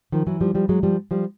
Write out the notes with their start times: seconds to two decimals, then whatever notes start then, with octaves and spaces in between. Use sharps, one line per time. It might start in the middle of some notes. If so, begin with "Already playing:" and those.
0.12 D#3 F3
0.27 E3 F#3
0.41 F3 G3
0.55 F3 G3
0.69 F#3 G#3
0.83 F3 G3
1.11 F3 G3